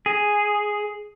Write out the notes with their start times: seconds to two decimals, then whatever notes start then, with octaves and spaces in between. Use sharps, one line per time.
0.06 G#4